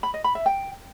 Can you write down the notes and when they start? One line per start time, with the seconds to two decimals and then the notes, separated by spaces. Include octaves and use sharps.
0.03 B5
0.14 D#5
0.24 B5
0.35 E5
0.46 G5